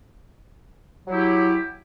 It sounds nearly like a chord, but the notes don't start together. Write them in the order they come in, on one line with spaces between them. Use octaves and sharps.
F#3 E4 G4